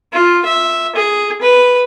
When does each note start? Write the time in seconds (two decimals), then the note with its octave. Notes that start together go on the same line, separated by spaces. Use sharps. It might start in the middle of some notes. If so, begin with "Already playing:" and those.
0.13 F4
0.45 E5
0.95 G#4
1.41 B4